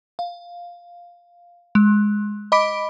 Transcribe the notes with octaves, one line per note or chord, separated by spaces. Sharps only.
F5
G#3
D#5 B5 D6 B6 D7